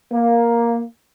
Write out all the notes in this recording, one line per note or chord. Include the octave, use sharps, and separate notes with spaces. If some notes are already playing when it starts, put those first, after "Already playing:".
A#3